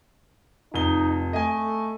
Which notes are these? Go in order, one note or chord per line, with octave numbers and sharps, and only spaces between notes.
F1 D#4 G7
A3 D#5 G#5